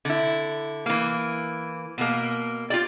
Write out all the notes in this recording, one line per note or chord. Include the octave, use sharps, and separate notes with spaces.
D3 E4
E3 A#3
B2 A#3
F4 G4 D5